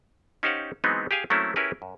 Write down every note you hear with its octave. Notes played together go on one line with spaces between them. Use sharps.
C#4 D#4 G4 C5 F5 F#5
E3 F#3 G#3 B3 C4 D#4
G4 G#4 F5 G#5
F#3 A3 A#3 C4 C#4 E4
C#4 E4 G4 G#4 A#4 B4
F#2